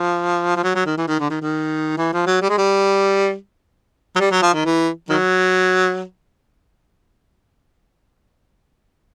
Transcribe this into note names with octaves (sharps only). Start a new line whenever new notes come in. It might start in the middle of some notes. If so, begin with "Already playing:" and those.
Already playing: F3
F3
F#3
F#3
D#3
E3
D#3
D3
D#3
D#3
E3
F3
F#3
G3
G#3
G3
F#3
G3
F#3
F3
D#3
E3
D#3 F#3